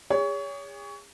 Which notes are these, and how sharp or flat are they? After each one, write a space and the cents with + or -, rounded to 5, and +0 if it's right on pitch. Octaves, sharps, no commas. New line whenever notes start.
G#4 -40 C#5 +25